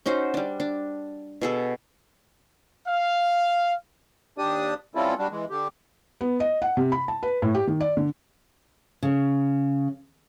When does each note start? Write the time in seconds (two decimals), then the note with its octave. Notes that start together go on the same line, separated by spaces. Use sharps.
0.06 C#4 D#4 F#4 C5
0.34 G3 D4
0.60 D4
1.41 B2 G#4 A4
2.88 F5
4.38 D#2 D4 G4 D5 D#6
4.95 G3 C4 C#4 E4 F4 A4
5.19 G3 D4 F#4
5.31 E3 G#3
5.50 D3 G4
6.21 B3
6.40 D#5
6.62 F#5
6.77 C3
6.92 B5
7.08 A5
7.23 B4
7.42 A2
7.54 G4
7.67 D#3
7.80 D5
7.97 D3
9.03 C#3